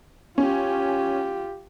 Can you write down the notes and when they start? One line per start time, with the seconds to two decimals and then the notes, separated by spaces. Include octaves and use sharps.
0.38 C#4 F4 G4